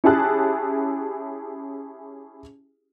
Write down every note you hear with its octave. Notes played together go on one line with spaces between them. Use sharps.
C#4 E4 G4 G#4 A5 F#6